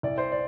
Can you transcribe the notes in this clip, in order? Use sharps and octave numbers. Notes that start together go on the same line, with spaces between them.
C2 D5
C5
D5